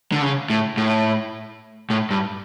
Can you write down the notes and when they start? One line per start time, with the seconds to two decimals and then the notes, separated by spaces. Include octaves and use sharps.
0.12 D3
0.22 C#3
0.50 A2
0.77 A2
1.90 A2
2.11 G2